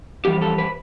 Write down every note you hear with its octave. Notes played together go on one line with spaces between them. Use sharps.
F2 E3 G3 G4
A4
B4